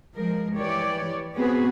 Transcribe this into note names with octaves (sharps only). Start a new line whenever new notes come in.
F3 G#3 A#4
E3 G4 C#5 D5
B3 C4 F#4 G#4 B4